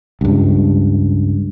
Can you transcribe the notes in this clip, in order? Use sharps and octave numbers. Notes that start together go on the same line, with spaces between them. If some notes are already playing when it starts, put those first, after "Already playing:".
C#2 G2